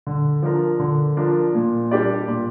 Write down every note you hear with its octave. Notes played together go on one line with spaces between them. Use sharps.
D3
F3 D4 A#4
D3
F3 D4 A#4
A#2
G3 D4 G4 D5
A#2